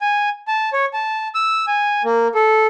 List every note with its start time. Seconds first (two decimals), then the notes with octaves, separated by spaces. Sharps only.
0.01 G#5
0.48 A5
0.73 C#5
0.94 A5
1.35 E6
1.67 G#5
2.04 A#3
2.35 A4